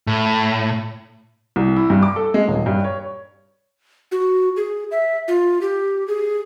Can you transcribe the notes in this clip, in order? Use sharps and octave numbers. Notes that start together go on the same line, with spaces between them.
A2
C2
E4
G2
D6
A4
G#3
D#1
G2
C#5
F#4
G#4
E5
F4
G4
G#4